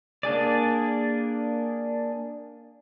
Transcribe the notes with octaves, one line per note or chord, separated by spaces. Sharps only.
A#3 D4 G#4 D5